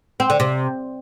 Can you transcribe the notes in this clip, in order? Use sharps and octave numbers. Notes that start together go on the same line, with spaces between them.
C4
D3
C3